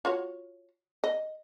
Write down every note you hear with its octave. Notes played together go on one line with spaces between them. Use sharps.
F4 F#4 C#5
D#5